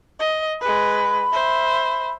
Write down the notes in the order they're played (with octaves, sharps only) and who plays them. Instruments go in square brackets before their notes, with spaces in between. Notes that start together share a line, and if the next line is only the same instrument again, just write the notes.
[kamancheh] D#5
[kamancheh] G#3 B4 [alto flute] B5
[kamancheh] C5 E5